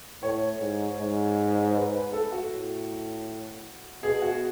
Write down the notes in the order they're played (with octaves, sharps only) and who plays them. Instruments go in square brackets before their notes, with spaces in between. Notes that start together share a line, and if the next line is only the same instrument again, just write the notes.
[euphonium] A2 [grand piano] C#5
[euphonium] G#2
G#2
[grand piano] B4
B4
A4
F#4
[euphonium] A2
[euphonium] B2 [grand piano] G#4
[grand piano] F#4